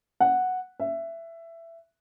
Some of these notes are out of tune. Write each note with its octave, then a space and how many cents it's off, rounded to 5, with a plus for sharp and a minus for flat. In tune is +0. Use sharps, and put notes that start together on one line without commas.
F#5 -5
E5 +15